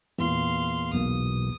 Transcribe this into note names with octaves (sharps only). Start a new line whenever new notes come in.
E2 A#2 F5 C6
B1 B2 A#3 D#6